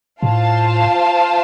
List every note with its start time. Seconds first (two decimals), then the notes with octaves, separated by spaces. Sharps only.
0.23 A2 F4 C5 F5 A5